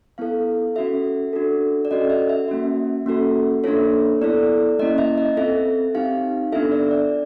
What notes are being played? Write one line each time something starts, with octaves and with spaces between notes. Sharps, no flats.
B3 E4 A4 F5
C#4 F#4 A4 E5
D4 F#4 A4
D5
C#4 F#4 A4 D#5
E5
E5
A#3 C#4 F#4
A#3 C#4 F#4 A4
A#3 D4 F4 A4 C#5
B3 E4 A4 D5
A#3 C#4 E4 D#5
E5
D#5
C4 F4 A4 E5
C4 D#4 G4 F5
B3 D4 F4 A4 E5
D5
D5